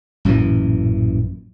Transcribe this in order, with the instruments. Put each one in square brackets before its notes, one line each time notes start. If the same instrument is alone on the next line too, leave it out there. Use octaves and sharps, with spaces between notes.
[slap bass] A1 F#2 A#2 E3